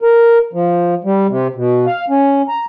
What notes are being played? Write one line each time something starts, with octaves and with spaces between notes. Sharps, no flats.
A#4
F3
G3
C3
B2
F5
C#4
A#5